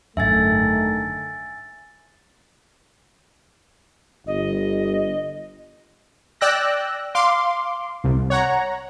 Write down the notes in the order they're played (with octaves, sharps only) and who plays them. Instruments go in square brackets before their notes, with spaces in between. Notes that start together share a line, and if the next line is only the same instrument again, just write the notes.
[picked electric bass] G#1 F#2 [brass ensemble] D3 D#3 A3 [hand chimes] E5 G#5 A6
[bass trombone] G1 [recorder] D#5
[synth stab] D5 G5 E6 F#6 A#6
F5 C6 D6
C2
C#5 F#5 A#5